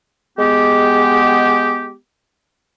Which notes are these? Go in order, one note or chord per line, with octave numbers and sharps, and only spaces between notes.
G#3 B3 G4